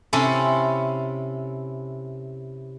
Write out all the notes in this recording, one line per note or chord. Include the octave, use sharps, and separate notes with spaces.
C3 C#4 E4 A4